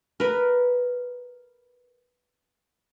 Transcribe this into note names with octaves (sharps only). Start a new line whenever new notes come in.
A#4 B4